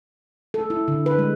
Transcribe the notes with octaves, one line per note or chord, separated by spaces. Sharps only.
A4
E4
D3
B4
G#3